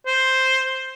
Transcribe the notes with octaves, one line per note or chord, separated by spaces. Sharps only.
C5